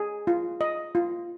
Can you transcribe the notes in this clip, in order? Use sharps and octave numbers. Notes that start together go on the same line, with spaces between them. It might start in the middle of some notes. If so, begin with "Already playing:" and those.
Already playing: G#4
F4
D#5
F4